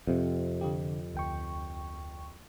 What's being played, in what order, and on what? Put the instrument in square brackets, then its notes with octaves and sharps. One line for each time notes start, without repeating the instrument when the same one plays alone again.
[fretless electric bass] F2 C3
[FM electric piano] D3 F4 G4
D2 G5 C#6